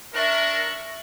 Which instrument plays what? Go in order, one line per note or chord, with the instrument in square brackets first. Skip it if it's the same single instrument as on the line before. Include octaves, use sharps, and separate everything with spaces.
[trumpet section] D4 A#4 [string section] E5 C#6 F#6